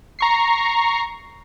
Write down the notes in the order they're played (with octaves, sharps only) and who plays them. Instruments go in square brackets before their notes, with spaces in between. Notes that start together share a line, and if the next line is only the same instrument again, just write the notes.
[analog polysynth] A#5 C#6 C7